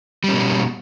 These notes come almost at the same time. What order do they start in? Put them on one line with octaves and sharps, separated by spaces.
G3 C#4 B2